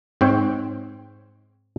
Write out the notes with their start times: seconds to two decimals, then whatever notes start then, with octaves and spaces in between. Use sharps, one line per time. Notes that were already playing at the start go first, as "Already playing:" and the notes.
0.21 G#2 C4 C#5 G5